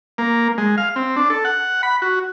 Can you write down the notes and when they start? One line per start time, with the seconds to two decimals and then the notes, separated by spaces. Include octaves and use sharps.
0.18 A#3
0.58 G#3
0.78 F5
0.96 C4
1.16 D4
1.30 A4
1.45 F#5
1.83 B5
2.02 F#4